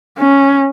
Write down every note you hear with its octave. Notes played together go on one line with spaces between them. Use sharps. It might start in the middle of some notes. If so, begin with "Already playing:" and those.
C#4